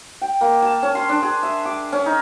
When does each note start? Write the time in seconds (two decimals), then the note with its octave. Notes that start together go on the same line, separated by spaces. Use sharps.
0.22 G5
0.41 A#3
0.62 A5
0.83 C#4
0.95 C6
1.09 D4
1.23 G#4
1.43 E5
1.65 D6
1.92 C#4
2.06 D#4